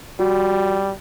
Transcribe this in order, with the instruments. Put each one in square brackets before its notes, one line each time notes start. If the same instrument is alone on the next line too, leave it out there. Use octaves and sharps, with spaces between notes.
[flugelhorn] G3 [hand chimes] F#4